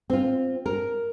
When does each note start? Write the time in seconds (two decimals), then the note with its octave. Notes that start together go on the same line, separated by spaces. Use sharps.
0.10 C4 F4
0.66 A#4